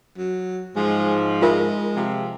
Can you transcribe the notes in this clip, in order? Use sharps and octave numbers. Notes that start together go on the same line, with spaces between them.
F#3
G#2 F3 G#3
G#3 F4 A#4 E5
C3 F3